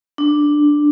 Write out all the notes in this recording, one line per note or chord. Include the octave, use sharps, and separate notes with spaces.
D4